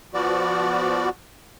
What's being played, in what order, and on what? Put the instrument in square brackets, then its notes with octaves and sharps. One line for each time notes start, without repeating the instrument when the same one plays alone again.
[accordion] F3 B3 F#4 D5